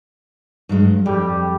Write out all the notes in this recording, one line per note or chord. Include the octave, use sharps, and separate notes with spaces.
G2 F#3 G#3
F2 G3 G4